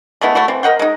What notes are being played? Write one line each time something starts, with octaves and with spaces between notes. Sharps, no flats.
G#3 A3 B3 E4
A3 E4 F#4
E3 C4
A#4 D#5 F#5 G5
G#3 D#4